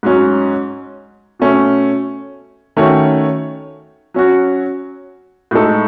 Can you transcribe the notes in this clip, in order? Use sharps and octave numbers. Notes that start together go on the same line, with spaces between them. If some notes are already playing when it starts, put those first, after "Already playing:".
G#2 F#3 C#4
B2 A3 C#4
D#3 A3 C#4 F#4 C#5
F#3 C#4 F#4
A2 G#3 D#4 A4